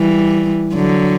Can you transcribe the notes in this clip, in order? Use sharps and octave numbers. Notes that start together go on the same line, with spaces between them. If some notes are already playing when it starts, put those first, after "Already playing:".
Already playing: E3 G3
D3 F#3